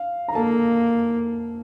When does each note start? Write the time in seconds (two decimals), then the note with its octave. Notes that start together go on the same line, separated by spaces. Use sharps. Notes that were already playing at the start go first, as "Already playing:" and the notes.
Already playing: F5
0.28 A#5
0.34 A#3 A4 A5